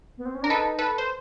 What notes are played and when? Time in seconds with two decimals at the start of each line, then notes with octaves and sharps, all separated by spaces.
0.18 B3
0.25 C4
0.35 C#4
0.42 D4 A#4
0.50 D#4 A4 B4
0.79 A4 B4
0.98 C5